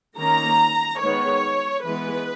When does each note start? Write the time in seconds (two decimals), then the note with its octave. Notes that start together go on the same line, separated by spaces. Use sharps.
0.18 D#3 A#3 C#4 A#5
1.00 D#3 G#3 B3 C#5
1.83 E3 G#3 B3 B4